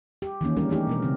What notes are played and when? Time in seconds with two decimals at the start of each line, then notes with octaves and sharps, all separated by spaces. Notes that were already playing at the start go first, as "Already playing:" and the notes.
0.22 G4
0.41 D#3 E3 A#3 C#4
0.57 G3 G#3 C#4 D4 A#4
0.69 E3 A3 D#4 G4
0.87 B2 B3 A#4
1.03 C#3 C4